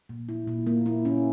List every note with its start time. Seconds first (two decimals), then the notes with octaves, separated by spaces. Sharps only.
0.09 A#2
0.29 E4
0.48 A#2
0.67 A#3
0.86 E4
1.05 C#4